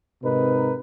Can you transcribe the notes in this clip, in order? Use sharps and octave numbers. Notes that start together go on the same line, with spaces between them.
G#2 C3 D#4 A#4 B4